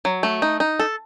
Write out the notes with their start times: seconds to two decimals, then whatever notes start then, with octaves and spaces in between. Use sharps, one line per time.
0.05 F#3
0.23 A3
0.42 D#4
0.60 D#4
0.80 A4